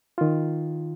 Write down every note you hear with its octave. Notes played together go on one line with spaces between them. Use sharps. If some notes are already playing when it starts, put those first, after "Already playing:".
D#3 F4